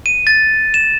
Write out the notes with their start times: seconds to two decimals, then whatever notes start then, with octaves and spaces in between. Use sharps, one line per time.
0.06 D#7
0.27 A6
0.74 E7